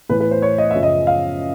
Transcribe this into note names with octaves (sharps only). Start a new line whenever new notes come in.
A2 E3 B4
B4
C5
C#5
D#5
F#2 C#3 F3 E5
D#5
F5